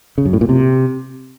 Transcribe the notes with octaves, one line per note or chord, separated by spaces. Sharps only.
C#3
F#2
A2
A#2
C3